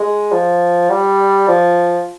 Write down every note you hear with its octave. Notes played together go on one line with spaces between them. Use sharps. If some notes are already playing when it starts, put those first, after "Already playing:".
Already playing: G#3
F3
G3
F3